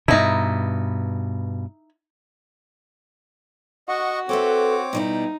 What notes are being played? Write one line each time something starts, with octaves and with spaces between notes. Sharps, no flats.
G2 B2 D#4 E4
F#4 D#5 F#5 C#6
C4 A4 B4 C#5 E5 D6
B2 G3 D#4 E4